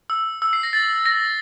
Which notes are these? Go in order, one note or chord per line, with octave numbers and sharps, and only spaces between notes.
E6
E6
C7
A#6
A6
A#6